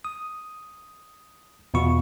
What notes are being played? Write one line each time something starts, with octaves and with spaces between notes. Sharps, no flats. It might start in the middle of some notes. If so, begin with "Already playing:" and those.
D#6
E2 B2 F4 C#6